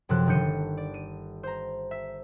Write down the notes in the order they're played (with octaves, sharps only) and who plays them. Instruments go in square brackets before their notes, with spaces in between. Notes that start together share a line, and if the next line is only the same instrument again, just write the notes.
[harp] F#2 C3 F3 A4 F#6
G1 D#3 D4 G6 C#7 D#7
D5
D#7
C5 A#5
E5